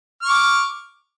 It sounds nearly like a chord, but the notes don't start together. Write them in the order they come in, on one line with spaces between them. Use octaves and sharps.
F6 C#6 D6